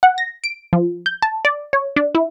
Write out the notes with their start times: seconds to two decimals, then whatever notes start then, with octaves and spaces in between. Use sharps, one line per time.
0.03 F#5
0.18 A#6
0.44 D7
0.73 F3
1.06 G6
1.22 A5
1.45 D5
1.73 C#5
1.96 D4
2.15 E4